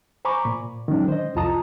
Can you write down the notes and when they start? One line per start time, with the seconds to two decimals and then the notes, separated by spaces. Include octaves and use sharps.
0.25 C5 G#5 A#5 B5 C#6 D6
0.45 A#2
0.88 D#3 F#3 G#3 C#4 D4
1.08 C5 D#5
1.35 C2 F2 F4 A5 A#5 D#6